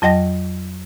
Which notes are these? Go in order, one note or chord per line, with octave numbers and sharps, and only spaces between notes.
F2 F#3 D#5 G5 A#6